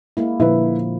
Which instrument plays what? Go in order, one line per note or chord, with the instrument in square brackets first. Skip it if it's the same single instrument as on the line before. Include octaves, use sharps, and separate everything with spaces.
[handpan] G#3 A#3 E4
[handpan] A#2 D3 F3 [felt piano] E4 B4